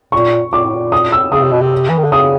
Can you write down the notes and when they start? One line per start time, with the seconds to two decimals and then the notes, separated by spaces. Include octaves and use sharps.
0.12 A#2 C#6
0.52 A#2 D6
0.64 A2
0.75 A#2
0.92 D#6
1.12 E6
1.32 C#3 D#6
1.42 C3
1.52 B2
1.61 C3
1.89 E3
1.97 D#3
2.04 D3
2.12 C#3 D#6